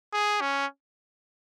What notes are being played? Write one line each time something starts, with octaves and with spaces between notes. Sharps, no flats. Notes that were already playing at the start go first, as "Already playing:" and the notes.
G#4
C#4